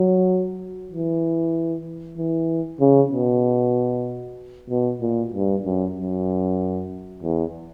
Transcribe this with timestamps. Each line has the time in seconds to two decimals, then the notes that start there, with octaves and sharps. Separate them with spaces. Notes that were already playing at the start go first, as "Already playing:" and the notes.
Already playing: F#3
0.91 E3
2.18 E3
2.80 C#3
3.12 B2
4.70 B2
5.01 A#2
5.33 G2
5.65 F#2
5.97 F#2
7.23 E2